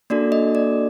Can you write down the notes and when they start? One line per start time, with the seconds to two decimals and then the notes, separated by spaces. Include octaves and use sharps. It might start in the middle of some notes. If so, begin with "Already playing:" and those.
0.10 A#3 D4 F#4 A4 D5
0.32 D#5
0.55 D5